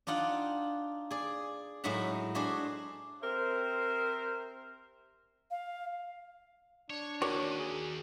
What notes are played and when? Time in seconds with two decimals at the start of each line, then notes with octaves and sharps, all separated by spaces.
0.07 D4 D#4 F4 F#5 G5
1.11 G#4 D5
1.84 A2 F#3 G#3 D#4 E5 F#5
2.35 D4 F#4 G#4 C5 E5
3.22 C4 G4 A#4 C5 E5
5.51 F5
6.90 D4 C#5
7.22 D#2 F#4 A#4 C#5 D5
7.59 G#4